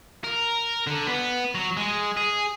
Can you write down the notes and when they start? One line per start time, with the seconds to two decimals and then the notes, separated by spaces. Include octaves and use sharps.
0.24 A#4
0.87 D3
1.07 B3
1.55 F#3
1.77 G#3
2.17 G#4